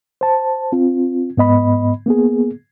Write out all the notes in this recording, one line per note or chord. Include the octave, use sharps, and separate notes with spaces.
C5 A5
C4 F4
G#2 B3 D#5 B5
A#3 B3 G#4